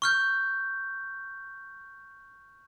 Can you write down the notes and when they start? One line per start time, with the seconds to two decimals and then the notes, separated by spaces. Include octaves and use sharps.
0.02 C#6 F6 G6